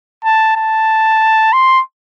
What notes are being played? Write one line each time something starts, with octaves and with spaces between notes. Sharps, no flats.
A5
A5
C6